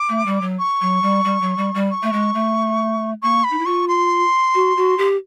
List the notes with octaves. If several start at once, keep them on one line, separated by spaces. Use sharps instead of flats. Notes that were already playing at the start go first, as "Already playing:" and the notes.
Already playing: D6
A3
G3
F#3
C#6
F#3
G3
G3
F#3
G3
G3
C#6
A3
G#3
A3
A#3 C#6
B5
D#4
E4
F4 C#6
C6
F#4
F#4
G4